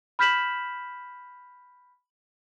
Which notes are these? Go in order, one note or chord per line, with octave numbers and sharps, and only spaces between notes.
B5 F6 G6 B6 E7 F#7